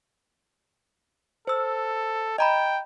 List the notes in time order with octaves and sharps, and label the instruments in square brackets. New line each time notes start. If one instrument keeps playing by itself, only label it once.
[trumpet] A4 [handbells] C5 E6
[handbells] D#5 A#5 B5 [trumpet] G5